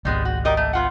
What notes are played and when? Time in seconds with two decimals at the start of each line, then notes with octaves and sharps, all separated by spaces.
0.05 G#1 C#2 G3 G#3 B3
0.25 F#4
0.45 G3 A#4 D#5
0.57 A3
0.73 B3 F4 F#5